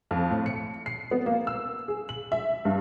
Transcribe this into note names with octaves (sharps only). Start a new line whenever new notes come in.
F2
A2
C#7
C7
B3
A#3
E6
G#4
F#7
E5
G2